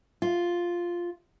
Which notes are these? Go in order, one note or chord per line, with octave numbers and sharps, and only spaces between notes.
F4